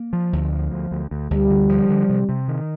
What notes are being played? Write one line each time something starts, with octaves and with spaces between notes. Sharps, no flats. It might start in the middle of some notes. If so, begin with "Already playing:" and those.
Already playing: A#3
F3
D2
F3
D2
D2
D2
D2 G3
D3
F3
D3
C3
C3
D#3